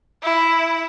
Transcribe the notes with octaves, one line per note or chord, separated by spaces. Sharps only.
E4